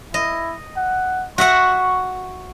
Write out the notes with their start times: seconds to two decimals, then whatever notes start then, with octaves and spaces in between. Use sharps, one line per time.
0.14 E4 D#5
0.76 F#5
1.38 F#4 E5 F#5 C#6